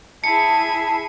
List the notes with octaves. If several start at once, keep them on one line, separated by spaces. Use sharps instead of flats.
E4 G#4 A5 C#7